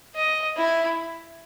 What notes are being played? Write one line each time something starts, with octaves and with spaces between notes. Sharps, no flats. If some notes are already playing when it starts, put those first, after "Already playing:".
D#5
E4